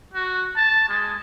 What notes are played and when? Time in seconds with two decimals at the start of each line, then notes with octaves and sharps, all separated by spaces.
0.14 F#4
0.56 A5
0.89 G#3